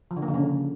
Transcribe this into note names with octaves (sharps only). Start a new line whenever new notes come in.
F3
D3
A#3
D3
C#3